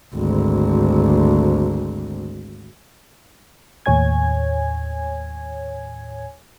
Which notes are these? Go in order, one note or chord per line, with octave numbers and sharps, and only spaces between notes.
G#1 D2
D#2 A2 C#5 G#5 G#6